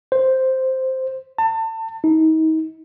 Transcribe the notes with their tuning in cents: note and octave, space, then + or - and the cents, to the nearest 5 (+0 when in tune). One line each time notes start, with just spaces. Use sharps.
C5 +0
A5 +30
D#4 +35